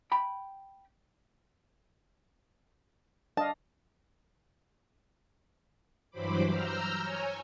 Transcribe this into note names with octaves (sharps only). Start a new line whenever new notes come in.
G5 B5
D4 D#5 F5 A5
G2 E3 F#3 C5 B5 D6
A#5 E6 F6 G6
C#5 G#5